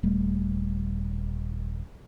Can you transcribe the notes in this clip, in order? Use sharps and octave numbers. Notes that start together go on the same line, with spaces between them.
D#1 G3 A3